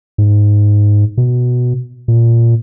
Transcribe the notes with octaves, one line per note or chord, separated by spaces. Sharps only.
G#2
B2
A#2